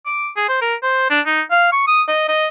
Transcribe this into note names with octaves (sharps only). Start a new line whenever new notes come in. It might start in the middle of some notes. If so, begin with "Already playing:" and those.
D6
G#4
C5
A#4
C5
D4
D#4
F5
C#6
D#6
D#5
D#5